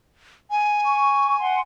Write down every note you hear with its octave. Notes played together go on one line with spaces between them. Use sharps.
G#5
C#6
F#5 C6